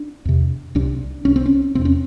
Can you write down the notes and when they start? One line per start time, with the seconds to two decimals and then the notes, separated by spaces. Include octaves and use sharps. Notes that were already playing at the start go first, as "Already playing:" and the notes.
Already playing: D4
0.25 E2 C3
0.75 C2 C3 D4
1.25 C2 C3 C#4
1.36 C4
1.46 C#4
1.75 E2 C3 C4
1.85 C#4